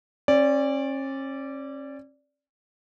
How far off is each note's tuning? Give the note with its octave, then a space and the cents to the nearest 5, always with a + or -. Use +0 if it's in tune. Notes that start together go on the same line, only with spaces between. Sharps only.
C#4 -40 D5 -10